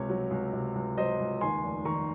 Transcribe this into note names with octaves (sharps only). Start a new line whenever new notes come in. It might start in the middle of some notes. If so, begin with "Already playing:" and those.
Already playing: C#2 C3 C#5
F#3
C#2
C3
C#2
F#3 C5 D#5
C#2
D#2 G#5 C6
F1
D#3 A#5 C#6